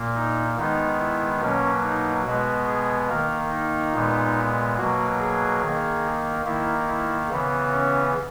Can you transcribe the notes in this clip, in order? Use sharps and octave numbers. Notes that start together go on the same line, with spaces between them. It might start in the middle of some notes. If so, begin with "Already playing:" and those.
Already playing: A#2 A#3
D#4
D#3 G#3 B3 D#4
E4
B2 F#3 A#3 C#4
D#4
B2 G#3 B3 F#4
G#4
D#3 A#3 A#4
D#4
A#2 G#3 B3
B2 F#3 A#3 F#4
G#4
D#3
A#3
D#3 A#3 E4
E4
C#3 E3 B3
C#4